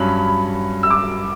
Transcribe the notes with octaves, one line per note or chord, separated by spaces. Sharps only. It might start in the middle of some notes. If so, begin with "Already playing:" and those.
Already playing: G2 F#3 C#4 B5
E6
D6